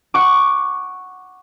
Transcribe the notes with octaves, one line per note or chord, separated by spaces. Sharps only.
F#5 C#6 D6